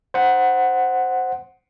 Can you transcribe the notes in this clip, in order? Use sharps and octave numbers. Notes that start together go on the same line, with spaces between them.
C5 F#5